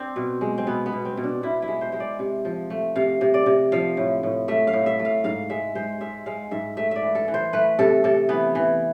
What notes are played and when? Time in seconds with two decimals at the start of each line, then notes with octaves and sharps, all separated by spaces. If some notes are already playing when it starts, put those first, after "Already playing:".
Already playing: C4 D4
0.16 B2
0.41 G#3
0.58 C4
0.67 B2 B3
0.86 B3
0.93 B2
1.05 C4
1.17 B2
1.24 D4
1.43 B2 E4
1.62 E4
1.68 G#3
1.81 C5
1.92 G#3 C5
2.00 D5
2.19 C3
2.45 F3
2.70 A3
2.95 C3 F5
3.21 C3
3.34 D5
3.46 C3
3.72 F3 F5
3.97 A2
4.23 A2
4.48 A3 E5
4.67 F5
4.73 A2
4.86 E5
4.99 A3
5.05 F5
5.24 G#2 F5
5.50 G#3 E5
5.75 G#3 C5
6.01 G#3 E5
6.26 G#3 F5
6.51 G#2 E5
6.77 A3 E5
6.91 D5 E5
7.02 E3
7.15 A4
7.28 E3
7.34 C5
7.53 A3 B4
7.79 C3 A4
8.04 C3 A4
8.29 E3 B3
8.55 E3